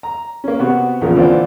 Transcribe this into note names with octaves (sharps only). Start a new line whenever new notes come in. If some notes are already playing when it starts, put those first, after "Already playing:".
A#5
A#3 C#4
C3 B3 F#4
E2 A#2 C#3 F3 A#4
D3 E3 A#3 C4 F4 D5